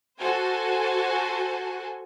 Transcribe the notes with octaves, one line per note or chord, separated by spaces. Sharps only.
F#4 A4 C5 F#5 G#5